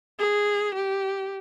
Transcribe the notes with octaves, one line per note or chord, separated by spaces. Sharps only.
G#4
G4